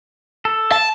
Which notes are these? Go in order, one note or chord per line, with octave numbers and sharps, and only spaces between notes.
A4
A5